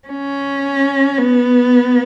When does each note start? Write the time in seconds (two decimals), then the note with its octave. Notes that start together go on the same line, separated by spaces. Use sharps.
0.08 C#4
1.18 B3